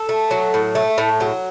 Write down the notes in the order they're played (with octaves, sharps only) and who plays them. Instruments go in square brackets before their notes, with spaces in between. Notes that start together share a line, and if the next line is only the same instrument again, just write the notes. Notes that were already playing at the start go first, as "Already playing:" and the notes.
Already playing: [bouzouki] A4
A3
F#3
A2
A3
A2
F#3